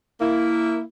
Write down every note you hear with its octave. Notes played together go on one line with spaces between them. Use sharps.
A#3 E4